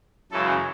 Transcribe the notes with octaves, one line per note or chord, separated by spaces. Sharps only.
F#2 C#3 E3 G#3 A4